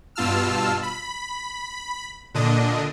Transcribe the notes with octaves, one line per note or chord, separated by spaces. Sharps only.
G2 B2 F4 A5 E6 F6
B5
A#2 D3 D4 D#5